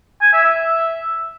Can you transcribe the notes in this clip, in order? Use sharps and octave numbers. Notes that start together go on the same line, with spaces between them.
G#5
E5
E5